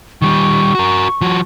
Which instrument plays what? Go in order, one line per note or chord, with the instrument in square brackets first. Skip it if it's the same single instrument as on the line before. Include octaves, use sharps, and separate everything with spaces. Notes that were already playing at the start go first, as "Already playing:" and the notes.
[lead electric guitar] D#3 G3 [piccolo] C#6
[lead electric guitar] F#4 A#4
F3 F#4